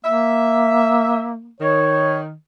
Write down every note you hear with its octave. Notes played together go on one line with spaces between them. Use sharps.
A#3 E5
D#3 C#5